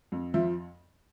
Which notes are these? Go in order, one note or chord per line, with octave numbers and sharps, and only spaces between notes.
F2
F3 E5